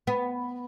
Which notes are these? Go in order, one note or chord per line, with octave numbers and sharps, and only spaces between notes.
B3